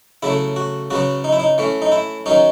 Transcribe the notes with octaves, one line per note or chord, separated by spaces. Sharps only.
C#3 F#3 A3 E4
F#4
C#3 F#3 B3 F#4
D#4
E4
D#4
E3 A3 C#4
D#4
E4
D#3 F#3 C#4 D#4